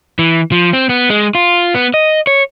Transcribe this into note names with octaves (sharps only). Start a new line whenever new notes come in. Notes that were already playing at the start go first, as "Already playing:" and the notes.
E3
F3
C4
B3
G#3
F4
B3
D#5
C#5